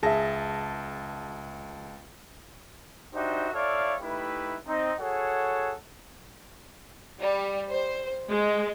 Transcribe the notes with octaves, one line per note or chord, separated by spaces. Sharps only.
C#2 G#4 E5 A5 A#6
D4 D#4 F#4 G4 C5 E5
E4 A4 C#5 D5 F5
A3 D#4 E4 G4 B4
C4 D#4
F#4 G#4 A4 C#5 F#5
G3
C5
G#3